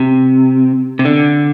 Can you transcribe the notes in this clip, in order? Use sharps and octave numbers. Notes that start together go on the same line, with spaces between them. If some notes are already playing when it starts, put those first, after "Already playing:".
Already playing: C3
C3
D3